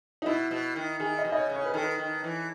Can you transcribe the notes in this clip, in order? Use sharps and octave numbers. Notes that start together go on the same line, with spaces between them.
D#4
B2 E4
B2
D#3
D#3 G#4
D#5
B2
D#5
C#5
C#3
C#5
B4
D#3 A4
B4
D#3
E3